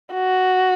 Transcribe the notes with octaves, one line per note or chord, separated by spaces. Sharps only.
F#4